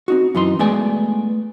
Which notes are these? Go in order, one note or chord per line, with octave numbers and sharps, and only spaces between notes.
C4 D#4 F#4
F#2 E3 D#4 C6
G#3 A3 B3 D5 G#5